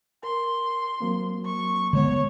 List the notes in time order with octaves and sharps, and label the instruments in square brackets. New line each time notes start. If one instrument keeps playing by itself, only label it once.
[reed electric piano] A#4 [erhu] C6
[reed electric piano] F#3 A#3 C4
[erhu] C#6
[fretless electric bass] D3 G#3 B3 [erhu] C#5